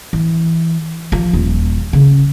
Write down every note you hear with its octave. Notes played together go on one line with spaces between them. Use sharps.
E3
F3
D#1
C#3